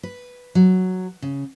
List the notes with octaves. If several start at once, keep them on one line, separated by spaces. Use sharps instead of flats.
B4
F#3
C#3